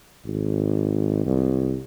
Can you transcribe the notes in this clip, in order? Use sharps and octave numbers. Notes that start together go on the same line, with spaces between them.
G#1
C2